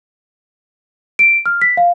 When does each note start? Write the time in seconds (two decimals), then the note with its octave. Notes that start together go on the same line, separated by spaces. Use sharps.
1.19 D7
1.46 F6
1.62 B6
1.77 F5